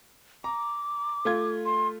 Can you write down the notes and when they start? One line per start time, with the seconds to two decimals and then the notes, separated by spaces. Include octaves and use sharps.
0.44 A#5 D6
1.25 A3 F4 G#6
1.65 C6